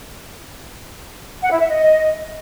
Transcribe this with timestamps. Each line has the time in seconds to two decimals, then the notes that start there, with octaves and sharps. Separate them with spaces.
1.42 F#5
1.50 E4
1.59 E5
1.68 D#5